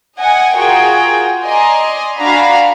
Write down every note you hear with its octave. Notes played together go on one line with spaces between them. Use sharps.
D#5 F#5 G#5
F4 F#4 G#4 A#4 G5
D5 D#5 G#5 A#5 C6
D4 F#4 F5 G#5 A#5 B5